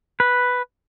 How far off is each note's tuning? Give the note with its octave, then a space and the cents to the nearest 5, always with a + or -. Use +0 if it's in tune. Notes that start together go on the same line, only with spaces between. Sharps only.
B4 +0